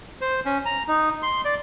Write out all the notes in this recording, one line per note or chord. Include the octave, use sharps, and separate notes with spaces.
C5
C#4
A#5
D#4
C6
D5